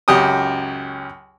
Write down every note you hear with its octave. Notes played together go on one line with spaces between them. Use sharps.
C#2 F#2 G4 G5 D#6